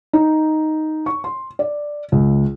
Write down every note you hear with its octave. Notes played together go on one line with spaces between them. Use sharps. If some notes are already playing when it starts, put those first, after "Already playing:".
D#4
C#6
C6
D5
C#2